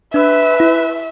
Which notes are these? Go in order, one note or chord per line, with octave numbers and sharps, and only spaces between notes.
D4 B4 E5 E6
E4